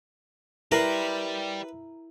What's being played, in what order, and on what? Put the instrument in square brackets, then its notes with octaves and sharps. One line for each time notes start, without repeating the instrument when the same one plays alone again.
[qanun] E4 C6 [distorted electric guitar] G4 D5 [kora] A#4 [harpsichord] B4